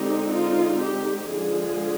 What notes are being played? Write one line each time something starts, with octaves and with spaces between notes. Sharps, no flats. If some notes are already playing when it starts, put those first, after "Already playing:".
Already playing: D3 G#3 C4 D#4 G4
F4
G4
D3 F3 G#3 G#4